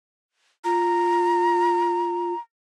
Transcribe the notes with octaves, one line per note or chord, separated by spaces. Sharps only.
F4 A#5